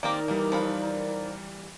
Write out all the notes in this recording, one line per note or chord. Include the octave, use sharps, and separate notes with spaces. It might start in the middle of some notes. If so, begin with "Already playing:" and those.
D#3 A#3 C4 D#4 G4 A#4 D5
E3 G3 A#3
F3 B4 F5